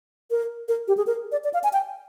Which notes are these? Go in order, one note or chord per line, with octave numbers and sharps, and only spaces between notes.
A#4
A#4
G4
G#4
A#4
D5
D5
F5
G#5
G5